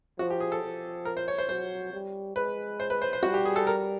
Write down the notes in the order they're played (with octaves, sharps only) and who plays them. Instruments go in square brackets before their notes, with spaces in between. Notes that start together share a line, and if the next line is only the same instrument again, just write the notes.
[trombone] F3 [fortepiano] F#4
[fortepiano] G4
G#4
A4
[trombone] F3
[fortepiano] A#4
C5
C#5
C5
[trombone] F#3 [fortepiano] C5
[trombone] G3
[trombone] G#3 [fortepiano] B4
[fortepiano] C5
B4
C5
C5
[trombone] G3 [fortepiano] F#4
[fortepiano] G4
G#4
A4
A#4